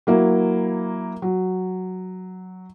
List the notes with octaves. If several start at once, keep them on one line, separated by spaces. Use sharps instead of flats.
F#3 A#3 E4
F#3